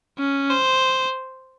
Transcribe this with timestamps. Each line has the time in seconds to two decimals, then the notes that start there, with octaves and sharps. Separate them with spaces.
0.19 C#4
0.50 C5